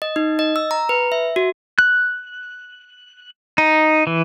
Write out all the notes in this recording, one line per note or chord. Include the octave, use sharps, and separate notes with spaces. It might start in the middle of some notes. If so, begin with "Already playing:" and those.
D#5
D#4
D#5
E6
A#5
B4
E5
F#4
F#6
D#4
E3